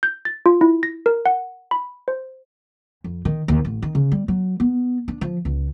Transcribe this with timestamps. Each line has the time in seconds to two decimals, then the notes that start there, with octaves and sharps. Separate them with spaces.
0.03 G6
0.25 A6
0.46 F4
0.61 E4
0.83 A#6
1.06 A#4
1.26 F#5
1.71 B5
2.08 C5
3.04 F2
3.25 D#3
3.48 D#2
3.65 A1
3.82 D#3
3.95 C#3
4.12 G3
4.28 F#3
4.60 B3
5.08 D4
5.21 F3
5.45 C#2